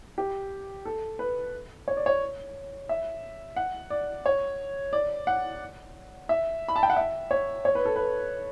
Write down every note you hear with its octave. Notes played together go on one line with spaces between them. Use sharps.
G4
A4
B4
C#5
D5
C#5
E5
F#5
D5
C#5
D5
F#5
E5
B5
A5
G5
F#5
E5
C#5
C#5
B4
A4
B4